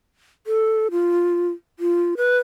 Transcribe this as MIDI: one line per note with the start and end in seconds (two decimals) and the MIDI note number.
0.47 0.88 69
0.91 1.50 65
1.79 2.14 65
2.17 2.38 71